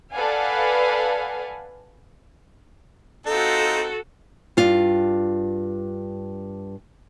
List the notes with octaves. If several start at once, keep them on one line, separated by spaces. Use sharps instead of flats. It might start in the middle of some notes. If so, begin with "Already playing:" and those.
A4 B4 D5 F5 F#5 G#5
C4 D#4 F4 F#4 A4
G2 F4